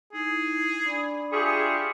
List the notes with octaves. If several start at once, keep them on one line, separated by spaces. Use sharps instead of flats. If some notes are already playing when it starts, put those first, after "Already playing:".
D#4 E4 G#4
D4 D5 B5
F4 G4 G#4 E5 C#6